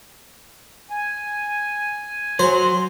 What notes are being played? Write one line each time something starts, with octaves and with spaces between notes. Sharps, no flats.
G#5
F#3 C5 C6